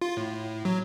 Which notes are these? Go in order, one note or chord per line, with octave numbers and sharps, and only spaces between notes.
F4
A2
F#3